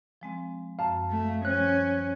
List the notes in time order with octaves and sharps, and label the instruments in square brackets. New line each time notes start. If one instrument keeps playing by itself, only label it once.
[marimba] F3 G#3 C4
[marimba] F#2 [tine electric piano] F5 A5
[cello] A3
[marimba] F3 G3 C5 [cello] C#4 [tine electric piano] F#6